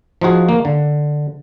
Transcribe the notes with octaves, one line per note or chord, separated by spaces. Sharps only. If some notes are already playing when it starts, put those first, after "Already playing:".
F3 D#4 F4 F#4 G#4
A#3
D3